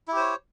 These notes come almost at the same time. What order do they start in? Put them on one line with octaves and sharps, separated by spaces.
E4 G4 C5 C#5